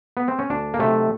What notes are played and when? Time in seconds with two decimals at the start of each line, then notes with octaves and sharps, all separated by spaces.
0.17 B3
0.28 C4
0.39 C#4
0.50 D2 D4
0.74 A#3
0.79 C3 D#3 F#3 A3